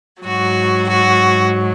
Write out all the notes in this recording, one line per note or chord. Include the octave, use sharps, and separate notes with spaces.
G#2 F#3 F#4
F#4